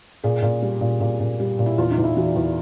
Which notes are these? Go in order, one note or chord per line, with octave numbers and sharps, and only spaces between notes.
A#2 G#4
A#2
G3
A#2
A#2
A#2
G3
A#2
E4
E2 F4
D#4
E2
E4
E3 F#4
E2